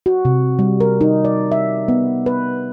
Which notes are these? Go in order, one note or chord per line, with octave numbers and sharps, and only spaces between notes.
F#4
C3
G3
A#4
D#4
D5
E5
B3
B4